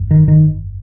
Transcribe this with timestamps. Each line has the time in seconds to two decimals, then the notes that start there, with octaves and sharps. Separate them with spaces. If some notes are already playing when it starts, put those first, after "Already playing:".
Already playing: G1 F2
0.11 D#3
0.28 D#3